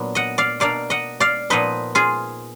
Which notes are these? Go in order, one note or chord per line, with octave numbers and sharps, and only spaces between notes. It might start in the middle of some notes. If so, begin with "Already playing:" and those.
Already playing: A#2 F#3 B3 D4
D#5 F#5
D5 F5
B2 A#3 D4 D5 F5
D#5 F#5
D5 F5
A#2 F3 B3 D#4 B4 D#5
F4 G#4